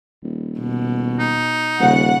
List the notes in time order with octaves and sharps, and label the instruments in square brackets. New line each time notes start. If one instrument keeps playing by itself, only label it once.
[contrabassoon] D#1
[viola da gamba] B2
[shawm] D#4
[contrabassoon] D#1 [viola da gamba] C#3 [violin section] F#5